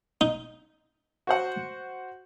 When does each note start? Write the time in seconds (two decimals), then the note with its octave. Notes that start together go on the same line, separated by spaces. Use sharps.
0.21 D#4
1.27 F#4 C5 F#5